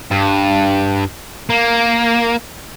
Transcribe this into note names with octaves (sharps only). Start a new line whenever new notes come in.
G2
A#3